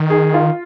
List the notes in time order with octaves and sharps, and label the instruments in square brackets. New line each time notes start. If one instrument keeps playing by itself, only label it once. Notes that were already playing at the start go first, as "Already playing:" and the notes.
Already playing: [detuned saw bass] D#3
[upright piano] G#4
F4